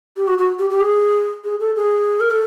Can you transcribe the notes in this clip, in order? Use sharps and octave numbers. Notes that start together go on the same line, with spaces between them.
G4
F#4
F#4
G4
G4
G#4
G#4
A4
G#4
A#4
A4